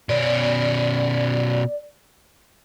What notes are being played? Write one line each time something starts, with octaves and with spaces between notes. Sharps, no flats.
B2 C#4 D5